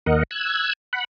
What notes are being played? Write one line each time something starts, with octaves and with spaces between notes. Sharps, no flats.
D#2 A#4 D#5 F#5
E6 F#6 G#6
F#5 B5